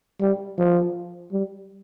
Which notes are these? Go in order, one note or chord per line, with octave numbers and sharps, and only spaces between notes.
G3
F3
G3